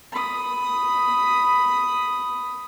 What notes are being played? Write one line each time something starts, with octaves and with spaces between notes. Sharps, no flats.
B5 D#6